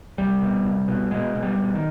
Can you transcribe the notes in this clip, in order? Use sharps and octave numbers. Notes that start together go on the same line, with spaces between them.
C2 G3
B2
C2
B2
B2 G#3
B2
G3
B2
D#3